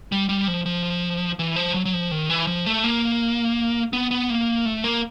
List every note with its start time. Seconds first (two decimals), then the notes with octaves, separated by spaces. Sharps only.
0.12 G3
0.29 G3
0.48 F3
0.66 F3
1.39 E3
1.56 F3
1.74 F#3
1.85 F#3
1.94 F3
2.11 D#3
2.29 E3
2.47 F3
2.66 A3
2.84 A#3
3.93 B3
4.11 B3
4.30 A#3
4.65 A3
4.84 A#3